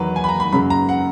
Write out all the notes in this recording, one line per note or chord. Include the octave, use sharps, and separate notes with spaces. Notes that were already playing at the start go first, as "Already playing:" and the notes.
Already playing: E2 D#3 F#3 B4
G#5
B5
A#5
B5
F#2 C#3 F#3 B5
A#5
F#5